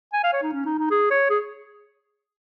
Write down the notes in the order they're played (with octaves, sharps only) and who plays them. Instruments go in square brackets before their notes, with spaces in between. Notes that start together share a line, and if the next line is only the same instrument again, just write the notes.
[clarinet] G#5
F5
C#5
D#4
C#4
D#4
D#4
G#4
C#5
G#4